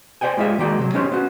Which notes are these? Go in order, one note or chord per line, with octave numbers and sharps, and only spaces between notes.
C5 D5 D#5 G5 G#5
G3 G#3 F4 D#5 E5
D#3 G#3 A#3 F#4 D5 G5
C3 F#3
B3 C#4 D#4 G4 C5 C#5
B3 C#4 F#4